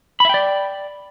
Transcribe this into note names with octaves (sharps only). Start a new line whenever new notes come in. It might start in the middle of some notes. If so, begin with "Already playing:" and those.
D5 E5 G5 B5